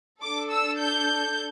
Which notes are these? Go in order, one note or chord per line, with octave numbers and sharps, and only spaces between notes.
D4 A4 D6
E6
G6